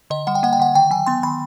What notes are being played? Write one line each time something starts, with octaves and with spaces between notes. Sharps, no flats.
D3 D#5
G3 F#5
G5
A#3 F#5
G5
D3 F#5
D#3 G5
F#3 G#5
B3 C6
D#3 B5